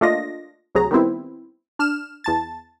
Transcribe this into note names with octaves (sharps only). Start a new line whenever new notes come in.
A3 A#3 D4 F4 D#5 A#6
D2 C3 F#3 G#4 A#5
D#3 G3 B3 C4 E4
D4 F6 E7
E2 A5 A6